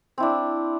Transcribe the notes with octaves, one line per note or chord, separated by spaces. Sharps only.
C4 D4 E4